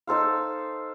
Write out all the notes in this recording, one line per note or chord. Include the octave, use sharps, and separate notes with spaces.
D#4 A4 C5 F5